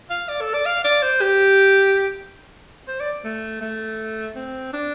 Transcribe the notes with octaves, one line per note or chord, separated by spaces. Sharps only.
F5
D5
A4
D5
F5
D5
C5
G4
C5
D5
A3
A3
C4
D4